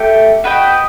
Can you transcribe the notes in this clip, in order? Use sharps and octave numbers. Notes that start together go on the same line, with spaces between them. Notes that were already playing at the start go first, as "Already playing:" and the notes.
Already playing: A3 G4
F#4 B4 D#5 G5